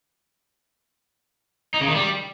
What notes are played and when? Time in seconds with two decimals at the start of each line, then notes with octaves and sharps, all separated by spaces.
1.74 D#4
1.81 C#3
1.88 D#3
1.95 G3